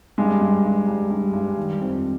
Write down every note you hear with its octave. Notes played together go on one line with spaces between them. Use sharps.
G2 G#3
G2
G2
G2
G2
G2
D#3
F2